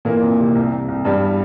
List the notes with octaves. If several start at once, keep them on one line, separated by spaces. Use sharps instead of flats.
A#2 E3 A#3
F2
C3
C2
C2
C2
E2 G2 G3